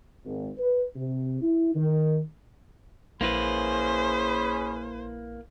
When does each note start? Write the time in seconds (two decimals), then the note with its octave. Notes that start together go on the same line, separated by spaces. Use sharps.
0.24 G#1
0.58 B4
0.96 C3
1.42 E4
1.75 D#3
3.21 A#1 A#3 C#4 E4 G#4 B4 C5 B5